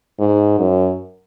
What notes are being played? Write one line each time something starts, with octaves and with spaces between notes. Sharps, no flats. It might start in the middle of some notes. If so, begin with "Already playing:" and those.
G#2
F#2